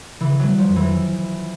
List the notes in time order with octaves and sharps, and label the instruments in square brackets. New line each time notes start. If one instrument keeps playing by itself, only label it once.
[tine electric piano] C#3 [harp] E3
[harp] F#3
[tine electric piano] G3
[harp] F3
[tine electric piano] F2
[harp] E3